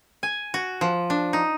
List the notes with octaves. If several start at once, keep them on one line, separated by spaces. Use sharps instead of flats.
G#5
F#4
F3
D4
D#4